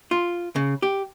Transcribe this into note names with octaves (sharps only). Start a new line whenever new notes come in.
F4
C#3
G4